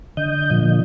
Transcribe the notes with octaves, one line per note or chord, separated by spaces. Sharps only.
D3 D#5 G6
A#2 D3 F3